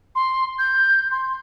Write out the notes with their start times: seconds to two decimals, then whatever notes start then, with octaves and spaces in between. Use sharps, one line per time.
0.15 C6
0.59 G6
1.11 C6